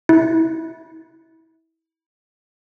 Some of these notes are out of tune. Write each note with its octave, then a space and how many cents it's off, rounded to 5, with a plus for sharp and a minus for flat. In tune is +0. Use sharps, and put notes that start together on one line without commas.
E4 -25